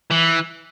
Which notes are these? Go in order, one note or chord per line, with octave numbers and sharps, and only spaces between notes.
E3